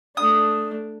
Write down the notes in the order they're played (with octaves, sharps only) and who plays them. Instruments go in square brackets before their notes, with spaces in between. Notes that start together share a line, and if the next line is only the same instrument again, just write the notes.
[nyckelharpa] A3 D4 [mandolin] D#6